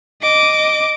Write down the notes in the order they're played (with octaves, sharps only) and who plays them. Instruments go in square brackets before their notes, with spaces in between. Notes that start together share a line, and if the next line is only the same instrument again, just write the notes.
[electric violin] D#5 D6